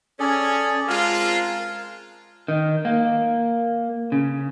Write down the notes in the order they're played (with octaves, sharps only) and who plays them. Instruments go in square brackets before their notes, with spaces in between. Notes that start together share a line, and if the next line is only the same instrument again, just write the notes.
[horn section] C#4 [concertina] G#4 A4 D5
[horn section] G#3 C4 F4 [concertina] A#4 A5
[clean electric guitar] D#3
A#3
C#3